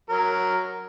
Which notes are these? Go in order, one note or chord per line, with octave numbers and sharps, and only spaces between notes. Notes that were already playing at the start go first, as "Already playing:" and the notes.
F#3 A#4